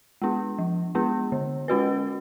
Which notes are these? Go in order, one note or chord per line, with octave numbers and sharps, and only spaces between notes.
G#3 B3 D4
F3
G#3 B3 D4
D3
G#3 C#4 F#4 B4